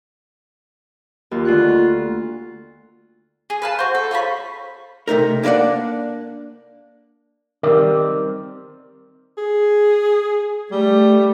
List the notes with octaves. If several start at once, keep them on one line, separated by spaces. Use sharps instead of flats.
D#2 F4
D2 F4 F#6
G#4
B4 F5 A5
F#4 C5
A4
F4 C5 C#5 B5
C3 A3 D#4 A#4
A#3 D4 A#4 D5 F#5
D#3 G3 C4 A#4 D5
G#4
G3 A3